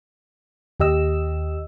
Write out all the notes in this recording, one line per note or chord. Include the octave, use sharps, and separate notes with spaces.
D#2 G4 D#5 E6